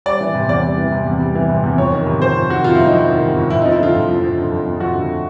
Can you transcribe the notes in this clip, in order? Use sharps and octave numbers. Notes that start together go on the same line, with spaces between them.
G3 D5
E3
C3
E2 D5
G3
E3
C3
E2
G3
E3
C3
E2
F2 C#5
D#3
C3
F2 C5
F2
D#3 F#4
C3 F4
E4
F2
D#4
F2 E4
D#3
C3
F2
F2 E4
D#4
F3
E4
D3 F4
F2
F2
F3
D3
F2
F2
F3 F#4
D3